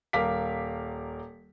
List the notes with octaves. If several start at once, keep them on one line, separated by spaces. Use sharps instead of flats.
D#1 A#4 F5 D6 B6